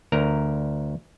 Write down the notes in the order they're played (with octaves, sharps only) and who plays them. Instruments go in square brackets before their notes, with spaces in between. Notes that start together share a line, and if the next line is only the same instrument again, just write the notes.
[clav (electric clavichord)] D2 A#4 A#5